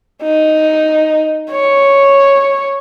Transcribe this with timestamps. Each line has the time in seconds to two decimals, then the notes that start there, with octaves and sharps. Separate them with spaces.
0.23 D#4
1.51 C#5